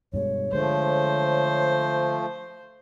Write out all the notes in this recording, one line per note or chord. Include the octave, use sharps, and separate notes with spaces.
G2 B2 G#3 C#5
D3 F3 G#3 A3 C5